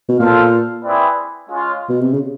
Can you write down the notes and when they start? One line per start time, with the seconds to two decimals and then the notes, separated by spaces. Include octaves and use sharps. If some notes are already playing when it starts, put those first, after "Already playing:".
0.09 B2
0.20 A#2 F4 A4 C5 F5
0.85 C4 E4 G#4 B4 D5
1.49 G#3 C#4 F4
1.89 B2
2.01 C3
2.13 C#3